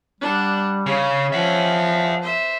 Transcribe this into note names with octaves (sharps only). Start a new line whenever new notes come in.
G3 D4 F#5
C#3 C#4
F3 E5 F#5
C5 E5